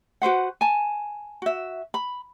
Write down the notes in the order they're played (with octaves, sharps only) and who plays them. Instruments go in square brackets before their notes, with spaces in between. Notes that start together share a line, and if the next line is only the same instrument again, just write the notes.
[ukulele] F#4 B4 C5 F#5
G#5 A5
F#4 E5
B5